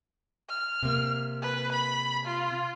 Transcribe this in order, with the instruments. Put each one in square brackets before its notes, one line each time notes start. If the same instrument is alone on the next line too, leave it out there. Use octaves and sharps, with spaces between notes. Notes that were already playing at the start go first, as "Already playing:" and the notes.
[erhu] F6
[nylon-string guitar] C3 A#3
[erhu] B4
B5
F4